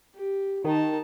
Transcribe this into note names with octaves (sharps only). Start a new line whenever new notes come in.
G4
D#3 D#4 A5